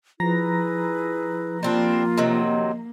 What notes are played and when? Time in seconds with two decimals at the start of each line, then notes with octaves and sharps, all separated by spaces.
0.20 F3 E4 G#4 B4 A#5 A#6
1.63 G3 A#3 C4 D4 F4
2.18 C3 D#3 F#3